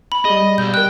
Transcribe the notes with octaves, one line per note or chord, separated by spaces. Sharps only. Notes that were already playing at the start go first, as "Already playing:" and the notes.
B5
G3 G#4 D#5
B1 G6
G#4 A#4 G5 F#6